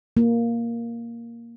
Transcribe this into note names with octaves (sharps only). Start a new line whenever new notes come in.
A#3